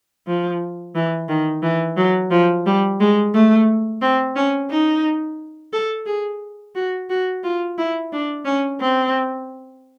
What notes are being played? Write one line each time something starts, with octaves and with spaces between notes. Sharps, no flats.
F3
E3
D#3
E3
F#3
F3
G3
G#3
A3
C4
C#4
D#4
A4
G#4
F#4
F#4
F4
E4
D4
C#4
C4